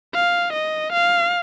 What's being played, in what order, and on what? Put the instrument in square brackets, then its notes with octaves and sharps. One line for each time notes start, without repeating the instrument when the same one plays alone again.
[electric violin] F5
D#5
F5